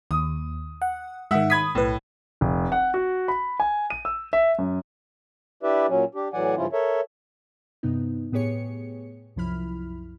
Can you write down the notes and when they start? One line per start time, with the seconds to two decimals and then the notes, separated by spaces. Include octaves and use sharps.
0.11 D#2 D#6
0.82 F#5
1.31 G#2 D#3 E5 F#5
1.50 B5 D#6 G#6 B6
1.75 B1 A2 B4
2.41 F1
2.72 F#5
2.94 F#4
3.28 B5
3.60 G#5
3.90 D#7
4.05 E6
4.33 E5
4.59 F#2
5.63 D4 E4 G4 B4 D5 E5
5.88 A#2 F#3 C#4
6.15 D4 G4
6.33 A2 E3 F#3 D5 F#5 G#5
6.56 G2 C#3 F3 C#4 E4 F4
6.73 A4 A#4 C#5 E5
7.83 G2 C3 B3 D#4
8.32 A2 B3 G4 G#4 C#5 C#7
9.36 C2 F#2 F3 E4 B5 F6